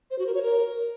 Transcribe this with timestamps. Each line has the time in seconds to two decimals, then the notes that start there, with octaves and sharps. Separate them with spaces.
0.11 C5
0.19 F#4
0.27 A#4
0.35 C#5
0.42 A#4